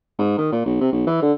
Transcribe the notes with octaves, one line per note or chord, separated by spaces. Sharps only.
G#2
D#3
A#2
B1
C3
B1
E3
D3